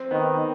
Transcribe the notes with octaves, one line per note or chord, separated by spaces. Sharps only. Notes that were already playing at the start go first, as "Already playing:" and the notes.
Already playing: C4
D#3 B3